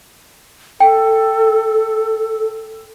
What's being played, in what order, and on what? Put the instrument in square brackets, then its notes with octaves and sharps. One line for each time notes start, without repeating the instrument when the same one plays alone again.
[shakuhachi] A4 [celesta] G5